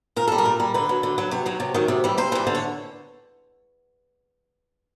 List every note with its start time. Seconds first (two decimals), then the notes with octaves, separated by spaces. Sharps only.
0.16 A#2 A#4
0.28 G3 A4
0.38 A#4
0.45 A#2
0.60 G3
0.74 D3 B4
0.89 F#3
1.03 D3
1.18 F#3
1.31 C3 C#5
1.46 D#3 F#3
1.60 C3
1.74 D#3 F#3
1.88 C3
2.04 E3 G3
2.18 C3 C5
2.32 E3 G3
2.47 D3
2.55 C#5